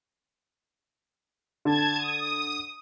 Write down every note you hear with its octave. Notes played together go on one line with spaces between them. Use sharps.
D3 A5 G#6
D#6